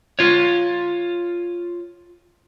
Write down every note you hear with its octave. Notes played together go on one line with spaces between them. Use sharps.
F4 C#5